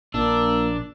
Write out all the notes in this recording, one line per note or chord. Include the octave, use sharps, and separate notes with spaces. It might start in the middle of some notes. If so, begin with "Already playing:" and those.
A#1 A#3 D4 E6